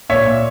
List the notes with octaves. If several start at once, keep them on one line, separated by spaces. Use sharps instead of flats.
A#2 C#5 E5
A#2